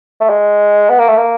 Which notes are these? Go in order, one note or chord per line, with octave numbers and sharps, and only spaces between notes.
A3
G#3
B3
A#3
A3
A#3